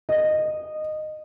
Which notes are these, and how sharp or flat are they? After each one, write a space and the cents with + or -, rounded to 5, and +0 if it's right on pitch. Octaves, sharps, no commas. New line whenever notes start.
D#5 -15